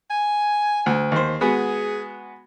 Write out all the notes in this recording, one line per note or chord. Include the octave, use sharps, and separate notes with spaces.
G#5
D2
D#2 C5
G#3 B3 F#4 G#4